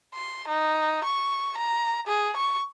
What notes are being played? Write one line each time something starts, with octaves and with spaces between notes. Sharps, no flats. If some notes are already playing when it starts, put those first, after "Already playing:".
C6
D#4
C#6
A#5
G#4
C#6